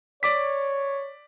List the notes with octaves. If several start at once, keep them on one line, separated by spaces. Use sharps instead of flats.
C#5 D5 D6 B6